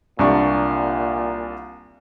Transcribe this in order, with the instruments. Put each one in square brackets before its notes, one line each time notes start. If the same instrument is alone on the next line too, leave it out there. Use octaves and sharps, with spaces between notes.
[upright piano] C2 D4 C#6 [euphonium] A#2